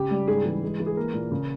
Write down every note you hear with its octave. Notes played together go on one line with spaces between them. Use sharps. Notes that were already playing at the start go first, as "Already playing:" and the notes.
Already playing: C#3 G4
G3
G#2 G#4
E3 G#4
G#3
E3
G#4
A#3 A#4
A#2
C#3